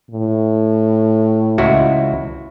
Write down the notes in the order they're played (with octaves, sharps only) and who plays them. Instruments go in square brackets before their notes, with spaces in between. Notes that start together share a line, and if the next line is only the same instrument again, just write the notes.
[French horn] A2
[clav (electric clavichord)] C#2 E4 F#4